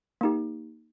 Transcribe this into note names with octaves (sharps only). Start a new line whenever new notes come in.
A#3 D#4 G4